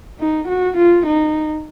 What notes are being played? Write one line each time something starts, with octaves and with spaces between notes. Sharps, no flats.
D#4
F#4
F4
D#4